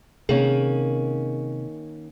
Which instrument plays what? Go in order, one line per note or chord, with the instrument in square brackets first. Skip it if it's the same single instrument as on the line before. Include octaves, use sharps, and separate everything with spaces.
[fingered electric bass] C3 [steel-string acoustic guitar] D#3 A#3 C#4 [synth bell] G#4